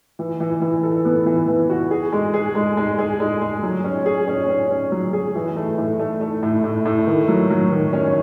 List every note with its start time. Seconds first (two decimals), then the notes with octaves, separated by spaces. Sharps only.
0.19 E3
0.40 E3
0.61 E3
0.83 A4
1.05 B3
1.26 E3
1.48 E3
1.70 F#4
1.91 G#4
2.13 G#3
2.34 G#4
2.55 G#3
2.77 G#3
2.98 G#4
3.20 G#3
3.42 G#3
3.63 F#3
3.84 C#4
4.06 G#4
4.28 C#4
4.49 C#4
4.71 C#4
4.92 F#3
5.13 G#4
5.35 E3
5.56 A3
5.78 A2
5.99 A3
6.21 A3
6.43 A2
6.64 A2
6.85 A2
7.07 D#3
7.28 F#3
7.50 F#3
7.71 D#3
7.93 C#4